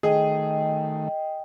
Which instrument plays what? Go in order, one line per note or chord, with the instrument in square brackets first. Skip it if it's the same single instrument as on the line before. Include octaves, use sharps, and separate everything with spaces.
[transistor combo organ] D#3 A3 [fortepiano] G#4 [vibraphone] D#5 G5